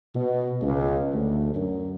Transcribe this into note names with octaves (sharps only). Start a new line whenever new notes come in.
B2
C#2
D2
F#2